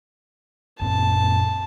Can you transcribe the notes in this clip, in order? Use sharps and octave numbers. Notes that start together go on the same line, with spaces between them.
F#2 A#2 C4 A5